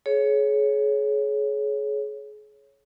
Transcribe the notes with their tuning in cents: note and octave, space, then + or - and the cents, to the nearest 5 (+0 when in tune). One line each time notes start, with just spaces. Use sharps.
G#4 +35 C#5 +0